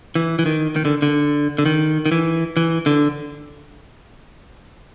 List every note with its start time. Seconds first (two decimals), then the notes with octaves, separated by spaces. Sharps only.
0.15 E3
0.39 E3
0.46 D#3
0.76 D#3
0.85 D3
1.02 D3
1.58 D3
1.66 D#3
2.06 D#3
2.12 E3
2.57 E3
2.86 D3